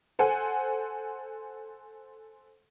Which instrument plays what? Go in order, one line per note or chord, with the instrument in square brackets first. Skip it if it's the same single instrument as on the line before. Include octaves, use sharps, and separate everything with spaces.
[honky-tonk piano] A4 C5 F#5 G#5